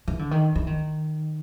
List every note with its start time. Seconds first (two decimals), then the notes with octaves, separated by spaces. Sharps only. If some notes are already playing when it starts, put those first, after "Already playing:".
0.08 E3
0.19 D3
0.31 D#3
0.56 E3
0.67 D#3